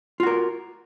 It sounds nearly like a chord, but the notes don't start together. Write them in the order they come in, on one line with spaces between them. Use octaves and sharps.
F4 F#4 A#4